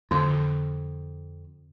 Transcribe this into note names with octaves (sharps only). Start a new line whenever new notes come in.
F2 D3